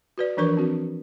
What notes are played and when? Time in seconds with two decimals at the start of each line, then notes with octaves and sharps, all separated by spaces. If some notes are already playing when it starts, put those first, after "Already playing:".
0.18 F#4 B4 D5
0.37 E3 F3 D4 A#4 B4 C#6
0.57 C4 F#4